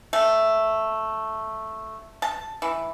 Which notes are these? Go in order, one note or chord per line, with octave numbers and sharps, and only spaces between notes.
A3
A5
E3